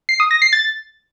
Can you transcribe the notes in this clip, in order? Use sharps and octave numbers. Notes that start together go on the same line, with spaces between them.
C7
D#6
A#6
C7
A6